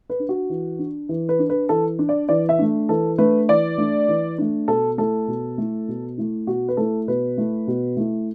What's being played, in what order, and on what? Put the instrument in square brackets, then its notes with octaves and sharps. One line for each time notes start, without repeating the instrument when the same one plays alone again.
[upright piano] B4
D4
F#4
E3
D4
E3
B4
D4
B4
E3 A4
D4
D5
E3 D5
E5
A3 D4
E3 A4
A3 D4 B4
E3 D5
A3 D4
E3
A3 D4
B2 A4
A3 E4 A4
B2
A3 E4
B2
A3 E4
B2 F#4
B4
A3 E4 A4
B2 B4
A3 E4
B2
A3 E4